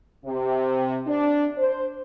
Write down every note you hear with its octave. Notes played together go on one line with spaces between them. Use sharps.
C3
D4
C5